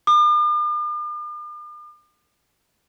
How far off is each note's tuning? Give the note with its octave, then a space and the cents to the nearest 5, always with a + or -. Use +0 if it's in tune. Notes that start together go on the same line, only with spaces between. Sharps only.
D6 +45